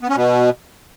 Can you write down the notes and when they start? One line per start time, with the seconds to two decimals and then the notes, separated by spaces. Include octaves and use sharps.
0.01 B3
0.09 C#4
0.16 B2